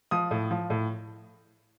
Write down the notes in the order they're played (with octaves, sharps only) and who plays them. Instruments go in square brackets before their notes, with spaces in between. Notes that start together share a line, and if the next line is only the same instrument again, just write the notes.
[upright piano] F3 D#6
A2
F3
A2